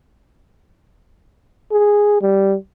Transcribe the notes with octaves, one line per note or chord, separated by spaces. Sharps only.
G#4
G3